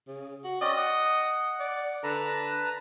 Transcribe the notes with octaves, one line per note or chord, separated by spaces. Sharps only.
C#3
F#4
C4 C#4 D5 D#5
F#5
D5
D3 B4 A5 A#5